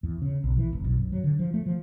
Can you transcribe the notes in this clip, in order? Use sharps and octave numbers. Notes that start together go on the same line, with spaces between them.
E2
C#3
B1
E3
F1
B1
F#2
F#3
D3
F3
A3
F3